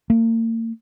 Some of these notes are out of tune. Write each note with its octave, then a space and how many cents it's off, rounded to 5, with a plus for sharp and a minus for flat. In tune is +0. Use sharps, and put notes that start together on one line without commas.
A#3 -40